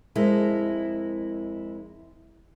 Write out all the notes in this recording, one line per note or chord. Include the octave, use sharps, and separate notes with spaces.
F2 G#3 E4 A#4